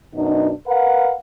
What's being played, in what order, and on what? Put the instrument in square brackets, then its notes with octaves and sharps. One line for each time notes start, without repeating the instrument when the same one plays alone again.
[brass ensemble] F#2 B2 D4 D#4
A#4 B4 F5 F#5